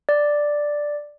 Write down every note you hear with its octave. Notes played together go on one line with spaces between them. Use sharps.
D5